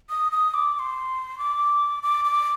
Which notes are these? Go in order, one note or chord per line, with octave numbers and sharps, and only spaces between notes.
D#6
D#6
D6
D6
C6
D6
D6
D6